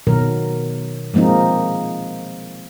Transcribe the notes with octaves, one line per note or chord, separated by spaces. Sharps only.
B2 D#3 F#3 A#4
F3 G#3 A#3 C4 D#4